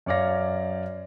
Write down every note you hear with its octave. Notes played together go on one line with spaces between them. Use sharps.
F#2 C#5 D5 F5 A#6